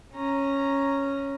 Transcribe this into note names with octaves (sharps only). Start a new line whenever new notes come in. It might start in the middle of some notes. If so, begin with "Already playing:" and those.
C#4 A#5